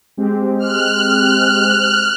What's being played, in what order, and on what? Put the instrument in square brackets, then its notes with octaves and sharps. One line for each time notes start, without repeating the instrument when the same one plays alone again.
[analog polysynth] G#3 C4 G4
[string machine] F6 F#6